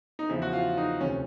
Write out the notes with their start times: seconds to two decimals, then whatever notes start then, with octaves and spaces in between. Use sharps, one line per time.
0.19 D#4
0.29 E2 C#3 F3 E4
0.42 F#4
0.53 F4
0.77 D#4
1.00 D2 C3 F3 C#4